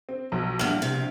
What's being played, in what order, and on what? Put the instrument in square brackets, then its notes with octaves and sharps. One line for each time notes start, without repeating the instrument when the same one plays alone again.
[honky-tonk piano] C4
B1 F3 A#5
[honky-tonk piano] A#1 F6 F#7 [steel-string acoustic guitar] E2 G2
[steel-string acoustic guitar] C3